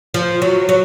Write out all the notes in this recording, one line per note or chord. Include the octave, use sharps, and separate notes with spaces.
F3
F#3
F#3